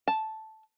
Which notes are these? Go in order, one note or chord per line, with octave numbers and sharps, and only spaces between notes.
A5